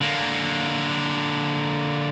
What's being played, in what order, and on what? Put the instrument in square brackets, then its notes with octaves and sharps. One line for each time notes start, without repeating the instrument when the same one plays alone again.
[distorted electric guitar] D3 A#3